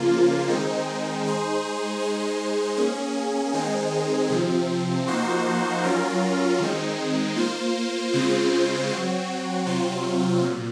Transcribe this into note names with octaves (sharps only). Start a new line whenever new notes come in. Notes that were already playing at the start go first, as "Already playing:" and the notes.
Already playing: C#3 F3 A#3 F4
D#3 G#3 C4 D#4
G#3 D#4 G#4 C5
G#3 D#4 G#4 C5
A#3 C#4 G#4
D#3 G#3 C4 D#4 G#4
C3 F3 C4
F3 A#3 D#4 F#4 C5
F#3 C#4 F4 A#4
D#3 G#3 C4 D#4
A#3 F4 C5
C#3 G#3 C4 F4 C5
F#3 C4 F#4
C3 F#3 C4 F4
A#2